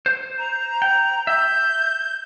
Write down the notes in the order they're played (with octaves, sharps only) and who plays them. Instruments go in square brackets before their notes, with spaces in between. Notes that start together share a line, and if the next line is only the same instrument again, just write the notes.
[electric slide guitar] C5
[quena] A#5
[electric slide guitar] G5
[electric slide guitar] E5 [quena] G6